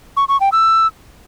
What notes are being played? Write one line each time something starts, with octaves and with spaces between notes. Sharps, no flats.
C#6
C#6
G5
E6